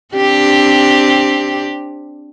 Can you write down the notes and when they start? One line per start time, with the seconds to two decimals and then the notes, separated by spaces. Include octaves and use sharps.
0.15 C4 D4 G4